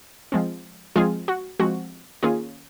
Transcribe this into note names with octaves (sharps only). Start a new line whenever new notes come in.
F3 G#3 C4
F3 G#3 C4 F4 G#4
F#4
F3 G#3 C4 F#4
D#3 A#3 C#4 F4 G#4